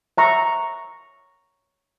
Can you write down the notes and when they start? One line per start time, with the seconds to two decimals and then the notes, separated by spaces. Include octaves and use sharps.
0.18 E5 A#5 C#6